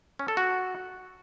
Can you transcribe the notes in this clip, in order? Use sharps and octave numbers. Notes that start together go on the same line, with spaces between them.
C#4
A4
F#4